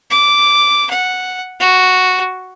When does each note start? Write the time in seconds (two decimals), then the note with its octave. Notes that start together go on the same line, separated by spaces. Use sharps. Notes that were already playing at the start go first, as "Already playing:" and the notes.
0.11 D6
0.91 F#5
1.60 F#4